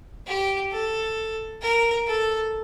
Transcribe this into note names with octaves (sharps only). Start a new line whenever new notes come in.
G4
A4
A#4
A4